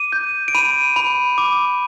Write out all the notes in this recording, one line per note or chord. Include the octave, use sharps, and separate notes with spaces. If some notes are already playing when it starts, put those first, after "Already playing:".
Already playing: D6 D#7
G6
D7
B5 D#7
B5
D6